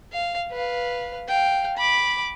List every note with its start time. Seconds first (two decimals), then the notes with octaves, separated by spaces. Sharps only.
0.13 F5
0.52 B4 F5
1.28 F5 G5
1.77 B5 D6